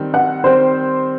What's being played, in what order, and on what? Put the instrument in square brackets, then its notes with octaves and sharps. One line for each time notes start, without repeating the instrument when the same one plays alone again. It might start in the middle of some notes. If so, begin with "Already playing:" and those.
Already playing: [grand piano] D#3 G3 C4
[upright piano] F#5
[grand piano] D#3 G3 C4 [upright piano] C5